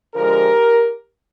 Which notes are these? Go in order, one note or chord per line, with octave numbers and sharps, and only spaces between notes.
D3 F3 G#3 G4 A#4